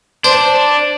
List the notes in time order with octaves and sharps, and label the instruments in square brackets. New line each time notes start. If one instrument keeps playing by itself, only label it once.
[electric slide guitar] D4 [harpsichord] C5